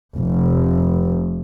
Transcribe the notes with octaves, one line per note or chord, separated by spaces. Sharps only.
F1